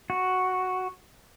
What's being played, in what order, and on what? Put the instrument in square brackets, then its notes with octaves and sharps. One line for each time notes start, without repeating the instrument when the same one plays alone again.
[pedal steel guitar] F#4